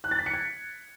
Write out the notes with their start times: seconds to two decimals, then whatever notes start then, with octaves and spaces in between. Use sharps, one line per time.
0.04 F#6
0.11 A6
0.19 B6
0.26 C#7
0.34 G#6